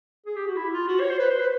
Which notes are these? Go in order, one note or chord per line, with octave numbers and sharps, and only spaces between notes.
G#4
G4
F#4
E4
F4
F#4
C#5
C5
B4
C5
B4